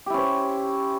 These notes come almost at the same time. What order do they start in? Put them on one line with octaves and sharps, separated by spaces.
G4 E4 C#4 C5